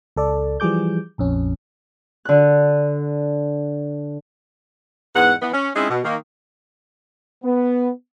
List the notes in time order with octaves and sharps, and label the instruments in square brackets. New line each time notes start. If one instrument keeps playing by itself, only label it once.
[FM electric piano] C#2 A4 D5
E3 F3 G3 G#4 D6 G6
A#1 F2 C#4
[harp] D3 F#6
[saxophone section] E2 G#2 B3 F#5
E3 B3
C#4
G#3 C4 C#4 D#4 E4 G#4
B2
D#3 A#3
[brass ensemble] B3